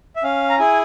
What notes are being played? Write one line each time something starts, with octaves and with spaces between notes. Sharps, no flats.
E5
C#4 F5
A#5
E4 G#4 G#5